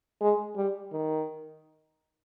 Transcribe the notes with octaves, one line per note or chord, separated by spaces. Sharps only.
G#3
G3
D#3